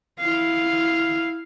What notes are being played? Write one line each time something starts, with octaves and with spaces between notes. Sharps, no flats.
E4 F5